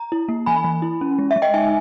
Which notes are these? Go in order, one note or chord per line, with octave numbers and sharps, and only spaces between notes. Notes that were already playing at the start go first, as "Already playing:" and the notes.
Already playing: A#5
E4
A#3
E3 G#5 B5
E3
E4
C#4
G#3
E5
G#3
D#5 G5
D#4 E5 G#5